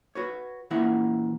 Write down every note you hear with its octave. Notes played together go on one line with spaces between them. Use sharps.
F#4 B4 C#5
A#2 E3 E4 F#5